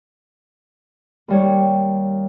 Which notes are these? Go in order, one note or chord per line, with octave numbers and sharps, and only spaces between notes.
D#2 G3 C#5